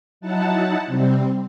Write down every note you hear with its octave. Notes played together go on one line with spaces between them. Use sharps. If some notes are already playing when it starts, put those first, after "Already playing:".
F#3 D#4 E4 F#5 A5
C3 G3 C4